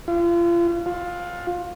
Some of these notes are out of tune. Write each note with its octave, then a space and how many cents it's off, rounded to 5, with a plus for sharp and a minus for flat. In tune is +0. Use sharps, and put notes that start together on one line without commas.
F4 -35
F4 +15